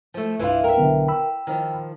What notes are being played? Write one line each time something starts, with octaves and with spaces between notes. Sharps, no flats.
F3 A3
C2 G2 E3 E4 F4 F5
A#4 E5 G5
B1 D3 B3
B5 E6
D#3 F3